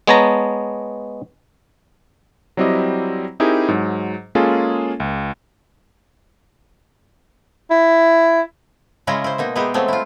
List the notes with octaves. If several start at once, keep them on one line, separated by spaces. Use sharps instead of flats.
G#3 B3 C#5 A5 A#5
F#3 G3 C4 E4 G4 D#5
C4 D#4 E4 G4 G#4 A#4
G#2 F#3
G#3 A#3 C#4 F4 G#4 A4
C#2
E4
C#3 G#3 C#4 E4 F4 A#5
E4 C5
B2 A#3 D#4
G#3 B3 D#4 E4 G4 G#4
F3 F#3 G#3 A3 C4
E4 F4